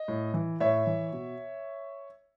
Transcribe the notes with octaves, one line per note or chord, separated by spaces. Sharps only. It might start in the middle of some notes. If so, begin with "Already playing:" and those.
Already playing: D#5
A2
E3
A2 C#5 E5
E3
B2